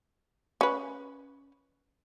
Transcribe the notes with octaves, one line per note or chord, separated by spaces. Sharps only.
C#4 B4